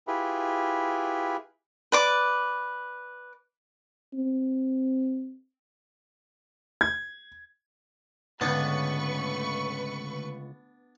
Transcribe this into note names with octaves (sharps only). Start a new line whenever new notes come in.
E4 F4 G4 G#4 B4
B4 D5 D6
C4
G#6
C#2 G#2 D3 A3 B3 D4 B4 C#6